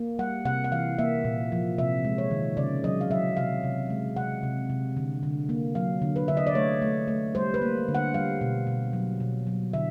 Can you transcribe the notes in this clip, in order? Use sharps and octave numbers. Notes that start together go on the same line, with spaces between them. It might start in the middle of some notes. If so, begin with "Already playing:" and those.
Already playing: A#3
G3 F#5
C3 F#5
F#5
E3 F5
A#3 E5
A#2
F3
C3 E5
G#3
C#5
D#3
C#3 D5
F#3 D#5
F5
F#3 E5
C3 F5
C3
G#3
C3 F#5
C3
C3
D3
D3
A#3
F#3 F5
D3
B4
D3 E5
D#5
D5
A3 C#5
A3
A3
G3 C5
B4
A#3
D3
F#5
G3 F5
B2
B2
F#3
B2
F#3
D3 E5